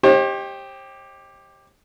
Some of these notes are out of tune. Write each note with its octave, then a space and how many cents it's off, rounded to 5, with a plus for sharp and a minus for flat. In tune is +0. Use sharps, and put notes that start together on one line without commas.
G4 +5 C5 +45 D#5 +5